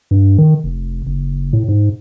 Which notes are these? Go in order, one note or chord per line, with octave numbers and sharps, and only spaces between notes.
G2
D#3
F1
F#1
A2
G#2